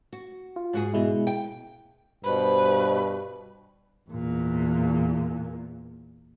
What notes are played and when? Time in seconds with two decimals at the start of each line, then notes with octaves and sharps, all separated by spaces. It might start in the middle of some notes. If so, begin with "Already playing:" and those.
0.13 F#4
0.56 F4
0.73 G#2 F#4 G#4
0.94 B2 G#3 E4
1.27 G5
2.25 G2 B2 B4 C5
4.10 E2 A#2